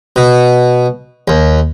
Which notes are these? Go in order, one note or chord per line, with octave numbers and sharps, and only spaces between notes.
B2
D#2